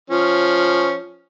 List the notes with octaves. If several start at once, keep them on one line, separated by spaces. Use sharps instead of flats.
F3 C#4